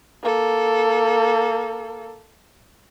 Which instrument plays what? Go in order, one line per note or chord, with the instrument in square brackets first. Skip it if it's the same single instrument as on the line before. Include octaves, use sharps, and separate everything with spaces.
[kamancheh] A#3 A4